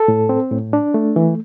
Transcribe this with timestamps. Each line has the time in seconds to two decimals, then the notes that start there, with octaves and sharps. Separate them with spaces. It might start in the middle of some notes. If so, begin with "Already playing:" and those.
Already playing: A4
0.08 A2
0.29 C4
0.52 A2
0.73 D4
0.94 A3
1.16 E3